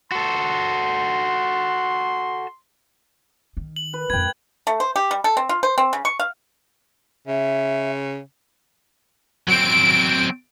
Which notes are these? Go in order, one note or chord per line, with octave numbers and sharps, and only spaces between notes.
F#4 A4 C6
D#3
F#7
B4
F2 G#3 B4 G5 G#6
A3
C5
G4
G3
A4
C4
F4
C5
C4
C#3
C#6
F5
C#3 E5
F#3 C4 D7